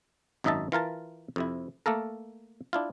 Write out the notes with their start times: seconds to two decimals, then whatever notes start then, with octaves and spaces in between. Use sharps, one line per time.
0.44 G#1 F#2 D#4 D#5 E5 A5
0.72 E3 F4 A#4 A5
1.36 F2 C3 E4
1.86 A3 A#3 A4 A#4
2.73 D4 E4 F4